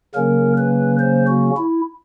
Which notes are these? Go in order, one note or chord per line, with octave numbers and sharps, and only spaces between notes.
C#3 F#3 A#3 C#4 A#4
B4
C5
F#4
E4